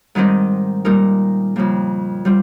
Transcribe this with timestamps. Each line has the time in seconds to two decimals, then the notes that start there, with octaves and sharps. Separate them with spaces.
0.15 G#2 D#3 G3 C4 D#4
0.85 A#2 G3 A#3 D#4 A#4
1.56 F2 C#3 G3 A#3
2.25 G3 C4 F4